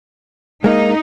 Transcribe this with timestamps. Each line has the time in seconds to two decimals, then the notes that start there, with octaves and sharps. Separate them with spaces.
0.64 G#3 A#3 D#4